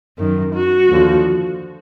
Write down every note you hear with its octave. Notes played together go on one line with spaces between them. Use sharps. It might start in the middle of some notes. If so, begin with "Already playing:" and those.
F#2 D#3
F#4
D#2 D3 F3